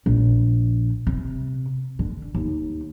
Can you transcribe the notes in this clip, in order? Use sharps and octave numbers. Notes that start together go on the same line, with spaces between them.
A#1
C3
D3
D#2